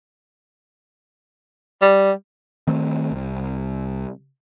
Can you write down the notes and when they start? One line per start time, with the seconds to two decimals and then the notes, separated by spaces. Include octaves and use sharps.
1.82 G3
2.67 D#3 A3 C4
3.11 C2